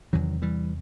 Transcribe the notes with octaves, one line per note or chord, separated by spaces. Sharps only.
E2 C3 D#3 F#3
E3 G3